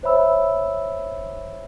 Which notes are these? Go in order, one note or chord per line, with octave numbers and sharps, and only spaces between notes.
C5 C#5 E5 B5 E6